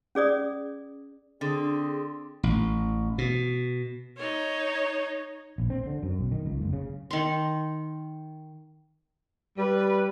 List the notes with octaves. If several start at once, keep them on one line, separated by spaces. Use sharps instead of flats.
C#4 G#4 D5 D#6
D3 C4 G#4
A1
B2
D#4 C#5
A#1
C4
D3
F#2
B1
D#3
C#2
F#1
C#3
D#3 C6
G3 B4